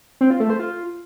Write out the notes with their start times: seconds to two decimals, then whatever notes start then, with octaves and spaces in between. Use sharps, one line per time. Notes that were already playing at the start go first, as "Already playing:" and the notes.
0.21 C4
0.30 F4
0.40 A3
0.50 C5
0.59 F4